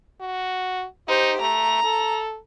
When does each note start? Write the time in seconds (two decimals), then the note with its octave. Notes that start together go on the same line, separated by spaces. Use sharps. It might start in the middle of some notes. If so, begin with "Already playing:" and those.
0.21 F#4
1.08 D#4 G4 C5
1.41 A3 A#5
1.84 A4